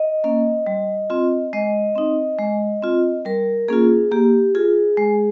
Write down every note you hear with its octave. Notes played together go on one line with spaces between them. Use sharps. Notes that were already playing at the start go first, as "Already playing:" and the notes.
Already playing: D#5
A#3 C#4
G3
C4 F4
G#3 D#5
C4 D#4
G#3
C4 F4
G3 A#4
A#3 C#4 F4 G#4
A#3 G4
F4 G#4
G#3